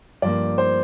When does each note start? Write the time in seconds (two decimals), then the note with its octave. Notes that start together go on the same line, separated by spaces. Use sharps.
0.22 G2 F3 A#3 D5
0.58 C5